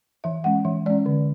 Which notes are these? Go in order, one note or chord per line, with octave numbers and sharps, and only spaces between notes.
E3 E5
G#3 C#4 F#5
E3 E5
G#3 C#4 D5
D3